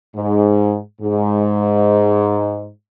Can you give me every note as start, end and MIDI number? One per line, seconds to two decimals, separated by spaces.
0.16 0.78 44
1.01 2.70 44